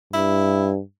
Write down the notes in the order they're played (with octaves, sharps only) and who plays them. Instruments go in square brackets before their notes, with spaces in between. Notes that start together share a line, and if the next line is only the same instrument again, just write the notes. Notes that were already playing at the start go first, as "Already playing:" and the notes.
[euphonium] G2 [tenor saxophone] E4